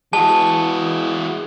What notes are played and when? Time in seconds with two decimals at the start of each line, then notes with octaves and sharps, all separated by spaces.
0.13 E3 G#3 F#4 A5